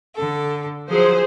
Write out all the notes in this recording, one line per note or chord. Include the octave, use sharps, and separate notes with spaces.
D3 A4
F3 F#3 G#4 C5